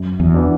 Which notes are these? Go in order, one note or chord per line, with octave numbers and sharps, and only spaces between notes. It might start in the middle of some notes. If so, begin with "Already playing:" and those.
Already playing: F#2
E2
E3 B3 D4